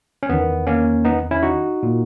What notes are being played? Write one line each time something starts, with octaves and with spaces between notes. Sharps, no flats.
C#4
E2 D#3 B3
A#3 C#4
B3 D#4
C#4 E4
D#4 F#4
A#2